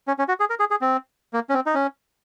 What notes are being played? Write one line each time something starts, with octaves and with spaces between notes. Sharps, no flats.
C#4
C#4
F#4
G#4
A#4
G#4
G#4
C4
A#3
C#4
C4
D#4
C#4